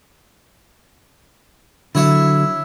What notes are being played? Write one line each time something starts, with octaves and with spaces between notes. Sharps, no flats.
D3 F#3 E4 C#5 E5